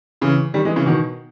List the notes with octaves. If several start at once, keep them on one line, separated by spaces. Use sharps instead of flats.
C#3 E3
D#3 G3
E3 G#3
C#3 E3
B2 D#3